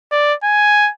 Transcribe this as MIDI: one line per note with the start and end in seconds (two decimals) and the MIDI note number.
0.12 0.34 74
0.44 0.91 80